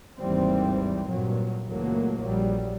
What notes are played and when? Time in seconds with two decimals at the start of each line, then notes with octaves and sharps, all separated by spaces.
0.19 G#1 D#2 E3 G3 C4
1.08 G2 A#2 F#3
1.68 C#2 A#2 E3 F#3 A3 A#3
2.22 A#1 F#3 G3